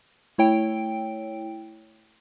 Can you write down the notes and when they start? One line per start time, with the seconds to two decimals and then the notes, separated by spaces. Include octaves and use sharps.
0.38 A3 E4 C#5 G5 D7